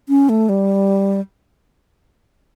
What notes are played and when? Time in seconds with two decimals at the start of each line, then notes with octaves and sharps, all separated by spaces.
0.09 C#4
0.29 A3
0.49 G3